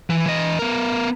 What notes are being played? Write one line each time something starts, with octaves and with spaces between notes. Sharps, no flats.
E3
E3 D#5
B3 A#4